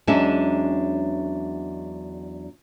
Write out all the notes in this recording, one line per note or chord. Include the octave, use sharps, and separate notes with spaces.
E2 F#3 G#3 C#4 D4 E5